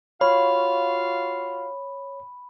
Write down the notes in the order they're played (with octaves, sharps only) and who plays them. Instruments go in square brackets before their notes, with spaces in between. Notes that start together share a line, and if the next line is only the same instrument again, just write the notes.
[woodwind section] F4 F#4 F5 [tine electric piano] C#5 [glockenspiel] B5